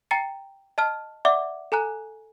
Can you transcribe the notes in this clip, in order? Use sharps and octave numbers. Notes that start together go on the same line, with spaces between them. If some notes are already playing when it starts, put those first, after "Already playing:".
G5 A#5 A6 C#7
D#5 A5 F6
D5 E5 F#5 D6
A4 G#5 A#5 F#6